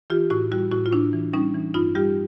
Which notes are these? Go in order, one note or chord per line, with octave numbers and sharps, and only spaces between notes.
E3 F4 G4
A2 E4 F#4
G3 E4 F#4
A2 E4 F#4
F4
A2 D4 E4
E3
G3 C#4 D#4
E3
G2 D#4 F4
G3 F4 G4